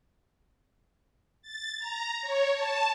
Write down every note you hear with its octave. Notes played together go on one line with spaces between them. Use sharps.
A6
A#5
C#5
A5